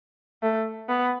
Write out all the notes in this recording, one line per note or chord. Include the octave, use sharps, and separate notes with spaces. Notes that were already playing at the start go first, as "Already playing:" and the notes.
A3
B3